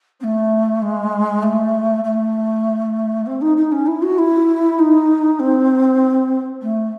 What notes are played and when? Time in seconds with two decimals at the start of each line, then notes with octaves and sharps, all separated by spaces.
0.20 C4
0.23 A3
0.82 G#3
1.42 A3
2.04 A3
3.26 C4
3.41 D#4
3.57 D#4
3.71 C#4
3.86 E4
4.02 F#4
4.18 E4
4.78 D#4
5.39 C4
6.62 A3